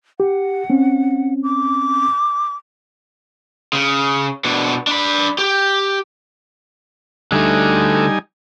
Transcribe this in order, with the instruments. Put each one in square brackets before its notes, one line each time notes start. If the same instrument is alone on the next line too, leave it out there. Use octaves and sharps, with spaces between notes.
[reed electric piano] G4 [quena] F#5
[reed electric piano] C4 C#4
[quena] D6
[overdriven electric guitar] C#3
B2 D4
D4 B5
G4
[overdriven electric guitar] D3 A3 [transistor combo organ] G3 D#4 G#5